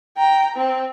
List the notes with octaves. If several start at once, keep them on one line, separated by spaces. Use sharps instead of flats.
G5 A#5
C4